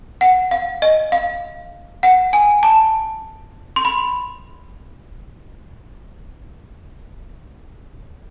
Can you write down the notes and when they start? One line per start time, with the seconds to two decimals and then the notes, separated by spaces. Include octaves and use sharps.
0.21 F#5
0.51 F5
0.82 D#5
1.12 F5
2.03 F#5
2.33 G#5
2.63 A5
3.76 C6
3.85 B5